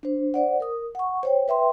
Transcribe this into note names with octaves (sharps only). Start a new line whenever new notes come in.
D4 C5
C5 D5 F#5
A#4 D#6
F#5 C#6
C5 C#5 G5
B4 E5 G5 C6